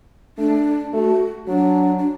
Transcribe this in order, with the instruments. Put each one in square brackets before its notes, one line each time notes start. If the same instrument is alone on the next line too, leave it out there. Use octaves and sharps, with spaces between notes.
[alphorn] A3 [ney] D4
[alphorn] A3 [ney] F#4
[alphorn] F#3 [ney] D4
[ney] D4